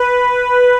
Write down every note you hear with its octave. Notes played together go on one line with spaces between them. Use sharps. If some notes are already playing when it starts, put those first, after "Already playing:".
Already playing: B4